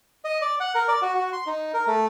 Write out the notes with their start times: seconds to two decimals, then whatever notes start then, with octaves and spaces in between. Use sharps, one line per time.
0.25 D#5
0.41 D5
0.60 F#5
0.75 A#4
0.88 D5
1.02 F#4
1.15 F#4
1.33 C6
1.47 D#4
1.74 A#4
1.87 A3